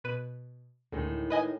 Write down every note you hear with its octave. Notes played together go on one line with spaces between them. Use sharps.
B2 B4 D#7
D2 A2 D#3 G#3
B4 D#5 G#5